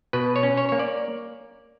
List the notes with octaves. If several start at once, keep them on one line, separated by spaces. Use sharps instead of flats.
B2 B4
C#5
C#4
C#5
A#3 C#5
D5